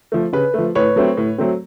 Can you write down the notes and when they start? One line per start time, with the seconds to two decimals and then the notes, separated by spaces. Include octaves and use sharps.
0.12 F3 A3
0.33 C#3 B4
0.54 F3 A3
0.75 A2 B4 C#5
0.96 F#3 A3 C4
1.17 A2
1.38 F#3 A3 C4